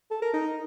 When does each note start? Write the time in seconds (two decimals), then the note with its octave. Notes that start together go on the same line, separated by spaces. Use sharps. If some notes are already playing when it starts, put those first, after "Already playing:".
0.11 A4
0.22 A#4
0.33 D#4